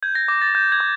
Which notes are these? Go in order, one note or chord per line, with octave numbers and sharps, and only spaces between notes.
G6 G#6
A#6
D6 A#6
A6
G6
G#6
D6